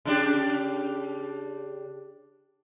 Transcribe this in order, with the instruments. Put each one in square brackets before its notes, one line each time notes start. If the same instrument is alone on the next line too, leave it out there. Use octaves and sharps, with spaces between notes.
[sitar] C#3 D4 G4